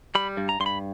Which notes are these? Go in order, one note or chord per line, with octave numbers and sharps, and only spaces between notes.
G3 B5
G2
A#5
G2 C6
B5